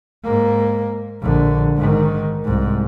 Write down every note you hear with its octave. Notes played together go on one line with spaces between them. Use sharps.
G#2 A#3
A#1 D3
G#2 D#3
C2 G#2